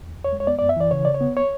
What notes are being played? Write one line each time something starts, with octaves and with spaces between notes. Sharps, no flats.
E2
E2
C#5
G#3
C#5
B3 D5
F#2 D5
E5
E3 D5
C#3 C#5
C#3 D5
C#5
B3
C#5